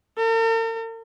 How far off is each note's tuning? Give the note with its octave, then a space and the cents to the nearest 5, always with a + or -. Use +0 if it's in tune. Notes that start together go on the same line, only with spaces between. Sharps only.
A#4 -45